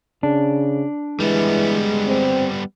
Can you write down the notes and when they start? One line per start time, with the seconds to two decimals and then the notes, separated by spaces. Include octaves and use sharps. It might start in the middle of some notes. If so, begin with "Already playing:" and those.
0.23 C#3 D4
1.20 E3 G3 G#3 B3
2.07 C4